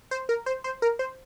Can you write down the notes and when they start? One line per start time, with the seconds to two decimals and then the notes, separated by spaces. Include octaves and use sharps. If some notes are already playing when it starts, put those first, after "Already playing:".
0.11 C5
0.29 A#4
0.46 C5
0.64 C5
0.82 A#4
0.99 C5